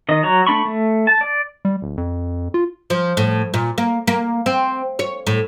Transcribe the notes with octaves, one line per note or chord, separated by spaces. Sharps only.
D#3 D#5
F#3 A#5 C#6
A3 D4 B5 C#6
A3
A5
D5
G3
D1
F2
F4
F3
A2
A#2
A#3
A#3
C4
C#5
A2